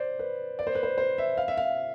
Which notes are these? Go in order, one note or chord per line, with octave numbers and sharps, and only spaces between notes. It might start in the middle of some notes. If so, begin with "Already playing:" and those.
Already playing: C5 D5
B4
D5
C5
B4
C5
C5
E5
F5
E5
F5